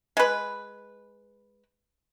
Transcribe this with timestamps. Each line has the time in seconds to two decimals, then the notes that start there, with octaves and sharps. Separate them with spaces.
0.17 G#3 B4